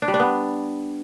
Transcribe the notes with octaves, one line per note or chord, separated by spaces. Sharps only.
D4
G3
D4
B3